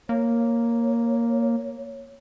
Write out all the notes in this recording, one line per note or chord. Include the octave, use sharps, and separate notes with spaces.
A#3 C#5